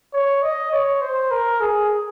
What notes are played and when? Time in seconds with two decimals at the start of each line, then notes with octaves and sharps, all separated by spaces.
0.13 C#5
0.43 D#5
0.72 C#5
1.01 C5
1.31 A#4
1.61 G#4